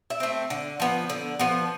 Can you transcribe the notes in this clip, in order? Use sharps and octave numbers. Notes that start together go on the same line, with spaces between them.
E5
A3 C4
D3
F3 B3
D3
F3 B3